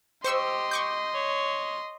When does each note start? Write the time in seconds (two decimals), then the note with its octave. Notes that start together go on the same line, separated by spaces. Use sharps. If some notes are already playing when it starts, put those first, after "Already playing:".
0.24 G4 C5 D#5 C6 C#6 E6
0.71 C#6 D6 G6
1.14 C#5